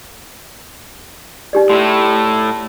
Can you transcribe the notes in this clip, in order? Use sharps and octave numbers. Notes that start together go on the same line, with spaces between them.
D#4 G4 D5
A2 A3 C6